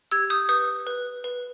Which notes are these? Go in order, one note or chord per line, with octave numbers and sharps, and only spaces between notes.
G4 E6 G#6
D#6 G6
B4 D#6 G6
B4
B4